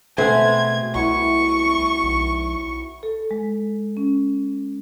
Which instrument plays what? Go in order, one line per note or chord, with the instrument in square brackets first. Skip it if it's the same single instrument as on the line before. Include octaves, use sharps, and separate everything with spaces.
[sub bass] B2 [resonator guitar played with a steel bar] G#3 A3 C5 [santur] B3 C4 [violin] G#6
[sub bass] C2 [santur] F#3 E4 F#4 [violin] C#6
[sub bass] B1
[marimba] A4
G#3
C#4